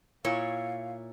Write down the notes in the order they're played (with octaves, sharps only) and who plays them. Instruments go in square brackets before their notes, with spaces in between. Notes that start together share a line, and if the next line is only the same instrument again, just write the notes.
[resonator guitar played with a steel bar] A#2 E4 C#5 [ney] F5